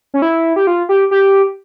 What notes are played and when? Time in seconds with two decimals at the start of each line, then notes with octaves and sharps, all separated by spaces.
0.14 C#4
0.22 E4
0.56 G4
0.67 F4
0.89 G4
1.11 G4